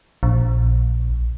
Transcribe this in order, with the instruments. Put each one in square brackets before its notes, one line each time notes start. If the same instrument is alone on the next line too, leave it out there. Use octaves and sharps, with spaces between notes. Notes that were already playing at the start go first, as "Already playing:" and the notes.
[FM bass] A#1